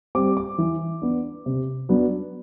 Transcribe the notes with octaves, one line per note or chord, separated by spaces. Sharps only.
G3 C4 D6
D6
E3
B3 D4
C3
F#3 B3 D4